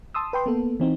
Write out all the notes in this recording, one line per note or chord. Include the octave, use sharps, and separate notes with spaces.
A5 C6 D#6 E6
B4 G5 C6
A#3 B3 A4
E3 C4 D#4